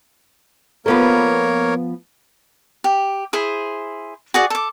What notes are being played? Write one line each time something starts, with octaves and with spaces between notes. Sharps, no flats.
F3 A#3 B3 A4 A#4 C#5
G4
E4 G#4 C5
F#4 G#4 D5
A4 D6